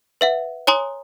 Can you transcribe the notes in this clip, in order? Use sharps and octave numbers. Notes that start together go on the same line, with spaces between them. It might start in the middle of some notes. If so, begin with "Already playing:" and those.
B4 E5 F#5
C#5 G#5 A#5 C6 D#6